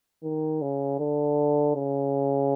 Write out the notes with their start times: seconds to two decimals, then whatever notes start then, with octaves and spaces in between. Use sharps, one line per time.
0.23 D#3
0.62 C#3
1.00 D3
1.76 C#3